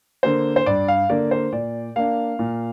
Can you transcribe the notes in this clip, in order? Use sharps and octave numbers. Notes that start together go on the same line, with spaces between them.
D3 A#3 C5
C5
G2 D5
F5
D3 A#3 D5
C5
A#2 D5
A#3 D4 F5
A#2